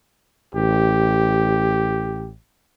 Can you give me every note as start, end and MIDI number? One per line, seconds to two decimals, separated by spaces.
0.55 2.35 33
0.55 2.30 67